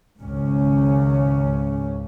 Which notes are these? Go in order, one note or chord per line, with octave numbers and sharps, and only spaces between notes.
G#1 C#2 C#4